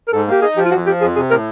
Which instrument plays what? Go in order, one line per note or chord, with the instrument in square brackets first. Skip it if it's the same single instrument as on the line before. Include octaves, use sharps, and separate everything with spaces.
[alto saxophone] A#4
[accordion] G#2 [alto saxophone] A4
[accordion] A#3 [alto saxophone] G4
[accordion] D#4 [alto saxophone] G#4
[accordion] F3 [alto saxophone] G4
[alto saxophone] F4
[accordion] F2 [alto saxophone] F#4
[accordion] F3 [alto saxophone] G4
[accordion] F2 [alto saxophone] G#4
[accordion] C3 [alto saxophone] G#4
[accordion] A2 [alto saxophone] A#4